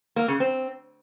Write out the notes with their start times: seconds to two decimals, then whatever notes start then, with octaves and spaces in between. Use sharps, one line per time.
0.16 A#3
0.28 C#3
0.40 C4